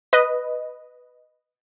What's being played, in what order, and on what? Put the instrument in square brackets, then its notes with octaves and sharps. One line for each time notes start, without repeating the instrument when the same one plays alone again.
[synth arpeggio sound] B4 D#5